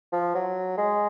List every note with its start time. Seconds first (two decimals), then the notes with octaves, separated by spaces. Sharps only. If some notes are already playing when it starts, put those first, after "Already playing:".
0.12 F3
0.35 F#3
0.78 G#3